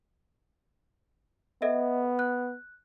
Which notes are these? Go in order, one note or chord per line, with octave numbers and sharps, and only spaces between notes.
B3 A4 D#5 E5
F#6